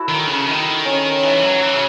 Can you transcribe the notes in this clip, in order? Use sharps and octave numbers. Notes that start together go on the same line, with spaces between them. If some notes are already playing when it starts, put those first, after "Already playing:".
Already playing: E4 F#4 A4
D#3
C#3
D#3
C#4
D#4
E3
F#3
E3
C#3